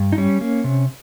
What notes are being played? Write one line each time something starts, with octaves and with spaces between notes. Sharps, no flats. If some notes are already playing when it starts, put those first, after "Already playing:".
Already playing: G2
D#4
G3 C#4
A#3
C3